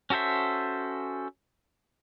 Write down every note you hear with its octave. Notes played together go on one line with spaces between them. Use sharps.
C#4 F#4 A4 C5 E5